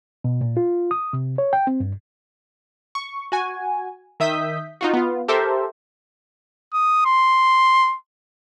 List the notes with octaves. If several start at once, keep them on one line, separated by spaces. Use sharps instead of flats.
B2
A#2
F4
D#6
C3
C#5
G5
C4
G2
C#6
F#4 G#5
D#3 E5 D#6 G6 B6
D#4 F4 F#4
B3 F4
G4 A4 A#4 C5 E5
D#6
C6